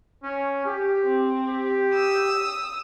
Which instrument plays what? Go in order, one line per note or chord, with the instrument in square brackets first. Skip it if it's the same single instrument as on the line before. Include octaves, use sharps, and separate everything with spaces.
[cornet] C#4
G4
[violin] C4
[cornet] G4
[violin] D#6 E6